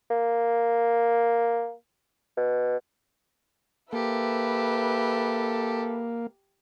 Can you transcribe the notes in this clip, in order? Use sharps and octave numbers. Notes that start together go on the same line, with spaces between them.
A#3
B2
A#3 G4 A4 B4 E5